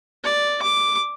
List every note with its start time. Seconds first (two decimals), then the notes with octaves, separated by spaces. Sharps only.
0.24 D5
0.62 D6